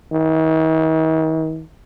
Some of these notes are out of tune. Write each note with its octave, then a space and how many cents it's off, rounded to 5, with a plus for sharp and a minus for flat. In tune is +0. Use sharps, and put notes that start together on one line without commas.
D#3 +45